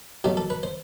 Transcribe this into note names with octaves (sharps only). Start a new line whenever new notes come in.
B2 F#3 A3 G4
A4
B4
C5